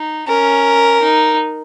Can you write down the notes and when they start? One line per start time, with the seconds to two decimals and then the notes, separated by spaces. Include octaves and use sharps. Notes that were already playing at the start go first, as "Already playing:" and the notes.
Already playing: D#4
0.28 C#4 A#4
1.02 D#4